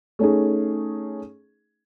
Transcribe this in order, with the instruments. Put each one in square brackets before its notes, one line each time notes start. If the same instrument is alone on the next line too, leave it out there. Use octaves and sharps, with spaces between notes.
[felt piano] A3 C#4 D#4 G#4